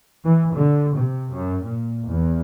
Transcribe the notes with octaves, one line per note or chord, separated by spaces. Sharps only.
E3
D3
C3
F#2
A#2
E2